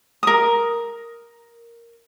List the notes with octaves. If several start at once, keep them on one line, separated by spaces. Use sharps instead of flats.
A#4 D#6